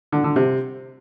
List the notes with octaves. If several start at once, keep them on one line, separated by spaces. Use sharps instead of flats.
D3
D3
C3